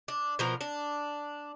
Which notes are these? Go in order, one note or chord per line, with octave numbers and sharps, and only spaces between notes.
D4
B2 F3 A#4
D4